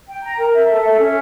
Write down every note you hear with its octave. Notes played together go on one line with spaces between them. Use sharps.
G5
A#5
A#4
E5
A4
E5
C#4